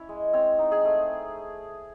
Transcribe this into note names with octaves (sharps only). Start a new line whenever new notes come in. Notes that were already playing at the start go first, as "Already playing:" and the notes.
Already playing: C#4 E4 C#5
G#3
C4 C#5
D#4
G#4
A3